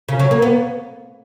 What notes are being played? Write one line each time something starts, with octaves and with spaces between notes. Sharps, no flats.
C#3
F#3
A#3
B3